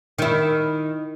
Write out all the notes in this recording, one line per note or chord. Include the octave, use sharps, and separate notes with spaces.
D#3 E4